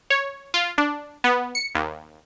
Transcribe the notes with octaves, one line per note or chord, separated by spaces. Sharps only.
C#5
F4
D4
B3
C#7
D#2